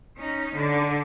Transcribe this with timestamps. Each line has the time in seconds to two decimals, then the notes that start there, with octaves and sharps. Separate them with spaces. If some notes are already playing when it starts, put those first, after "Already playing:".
0.18 C#4 D#4
0.55 D3